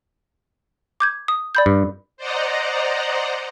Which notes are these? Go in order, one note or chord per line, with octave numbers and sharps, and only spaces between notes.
D6 G6 G#6
D#6
D5 B5 G6
G2
C5 D5 D#5 F#5 A#5